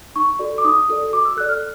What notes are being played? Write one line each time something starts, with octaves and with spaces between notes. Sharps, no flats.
D#4 C#6
F#4 A4 D5
D6
D#4 D#6
F#4 A4 D5
F#4 D6
E6
A4 D5 F#6
F6